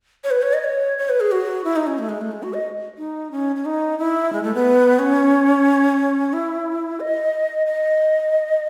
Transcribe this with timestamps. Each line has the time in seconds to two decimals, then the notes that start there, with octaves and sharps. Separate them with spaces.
0.24 C#5
0.31 B4
0.42 C#5
0.53 D#5
0.64 C#5
0.98 C#5
1.09 B4
1.20 G#4
1.32 F#4
1.64 E4
1.76 D#4
1.87 C#4
1.98 A3
2.09 G#3
2.21 A3
2.32 G#3
2.43 F#4
2.54 D#5
2.98 D#4
3.31 C#4
3.56 C#4
3.65 D#4
3.98 E4
4.33 G#3
4.43 A3
4.55 B3
4.99 C#4
6.33 E4
7.00 D#5
7.66 D#5